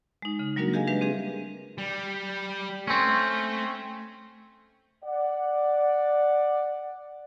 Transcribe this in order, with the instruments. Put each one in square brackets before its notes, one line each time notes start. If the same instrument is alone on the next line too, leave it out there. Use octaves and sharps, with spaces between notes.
[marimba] G#3 D#4
C#3
F#3 G3 A#3 D4 F#4 A#4
G4 G#4 A#4 D#5 F5 G#5
G3 G#3 D4 G4 B4 E5
C4 D4 G4 G#4
[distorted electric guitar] G3
[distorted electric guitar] A3 [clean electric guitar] C4 C#4
[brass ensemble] D5 F#5